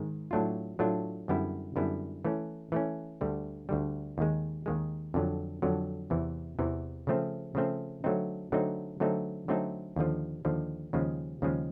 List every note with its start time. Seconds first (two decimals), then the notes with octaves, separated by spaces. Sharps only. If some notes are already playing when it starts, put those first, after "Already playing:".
Already playing: G#2 D#3 G#3
0.31 A2 F#3 A3 D4 F4
0.79 A2 F#3 A3 D4 F4
1.28 F#2 D3 G3 B3 E4
1.76 F#2 D3 G3 B3 E4
2.25 E3 A3 C#4
2.72 E3 A3 C#4
3.21 D2 D3 G3
3.69 D2 D3 G3
4.18 D#2 D#3 G#3
4.66 D#2 D#3 G#3
5.14 F2 D3 F#3
5.62 F2 D3 F#3
6.10 E2 C3 E3
6.59 E2 C3 E3
7.07 C#3 F3 A3 C4
7.55 C#3 F3 A3 C4
8.04 D3 F#3 A3 C4 D#4
8.52 D3 F#3 A3 C4 D#4
9.00 D3 F#3 A3 C4 D#4
9.48 D3 F#3 A3 C4 D#4
9.96 D#2 D3 F3
10.45 D#2 D3 F3
10.93 D#2 C#3 F3 G#3
11.42 D#2 C#3 F3 G#3